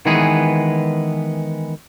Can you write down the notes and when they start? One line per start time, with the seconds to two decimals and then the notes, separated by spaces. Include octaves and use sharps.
0.06 D#3 E3 G#3 B3 G#4